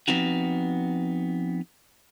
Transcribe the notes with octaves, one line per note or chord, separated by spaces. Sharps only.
F3 B3 C4 D#4 F#4